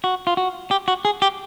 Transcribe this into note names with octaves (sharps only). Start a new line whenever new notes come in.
F#4
F4
F#4
G4
F#4
G#4
G4